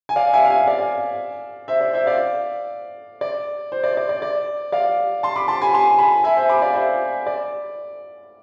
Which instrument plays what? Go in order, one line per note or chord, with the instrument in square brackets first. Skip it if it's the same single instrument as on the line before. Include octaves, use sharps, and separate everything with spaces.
[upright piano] G#5
D5 F5
E5 G#5
F5
E5 G#5
D5 F5
C5 E5
D5
C5 E5
D5 F5
D5
C5
D5
D5
D5
D5
D5 F5
A5 C6
B5 D6
A5 C6
G#5 B5
A5 C6
G#5 B5
E5 G#5
C5 E5
B5 D6
D5 F5
C5 E5
D5